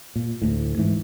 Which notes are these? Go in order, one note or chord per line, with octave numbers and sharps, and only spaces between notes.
A#2
D2 A2
G#2 E3